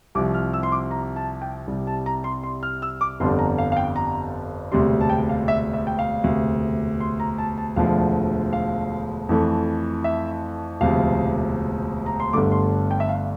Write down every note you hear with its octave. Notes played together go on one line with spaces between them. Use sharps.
C2 C3 F3 D6
F6
E6
C6
D6
A#5
A5
G5
C2 C3 G3
A5
A#5
C6
C6
F6
E6
D6
G1 F2 D3 G3 C6
A#5
F5
F5
G5
A#5
E1 D2 C3 G3 C6
A5
G5
F5
E5
E5
G5
F5
E1 D2 C3
C6
A#5
A5
A5
E1 D2 D3 F3 A3 F5
F5
F2 E3 A3
E5
E1 D2 C3 F3 F5
A#5
C6
G1 G2 D3 A3 D6
C6
G5
E5
F5